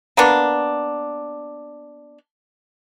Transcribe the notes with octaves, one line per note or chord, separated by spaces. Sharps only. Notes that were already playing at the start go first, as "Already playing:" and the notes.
A#3 B3 D4